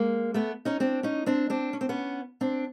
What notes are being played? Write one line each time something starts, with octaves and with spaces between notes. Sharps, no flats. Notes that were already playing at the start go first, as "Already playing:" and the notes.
Already playing: G#3 A#3
A3 B3
C#4 D#4
C4 D4
C#4 D#4
C4 D4
C4 D4
C#4
C4
B3 C#4
C4 D4